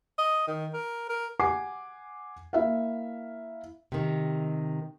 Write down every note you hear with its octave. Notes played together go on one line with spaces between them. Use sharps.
D#5
D#3
A#4
A#4
F#5 G#5 D6 C7
A#3 E4 E5 F5
C3 D#3